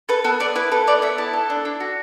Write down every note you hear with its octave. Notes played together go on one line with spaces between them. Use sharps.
A4 B4
B3 A4
B3 D5
E4 B4
A4 B4
B3 D5
B3 E5
E4 A5
A4
D4
D4
F#4